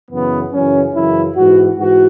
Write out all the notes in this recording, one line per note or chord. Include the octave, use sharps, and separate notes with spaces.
F#2 C#3 E3 B3
F#2 C#3 E3 C#4
F#2 C#3 E3 E4
G#2 E3 F#4
G#2 E3 F#4